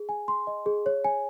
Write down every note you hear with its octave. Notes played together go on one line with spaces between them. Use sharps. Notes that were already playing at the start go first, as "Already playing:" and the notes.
Already playing: G#4
G#5
C6
D#5
G#4
C#5
G#5